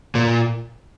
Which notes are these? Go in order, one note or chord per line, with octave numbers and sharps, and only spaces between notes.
A#2